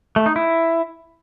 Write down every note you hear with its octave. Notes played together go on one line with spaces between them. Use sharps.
A3
D#4
E4